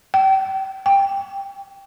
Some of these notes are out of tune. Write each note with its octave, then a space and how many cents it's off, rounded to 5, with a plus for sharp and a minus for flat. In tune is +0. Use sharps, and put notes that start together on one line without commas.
G5 -30
G5 +10